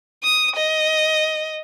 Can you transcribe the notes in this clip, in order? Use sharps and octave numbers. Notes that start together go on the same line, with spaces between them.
D#6
D#5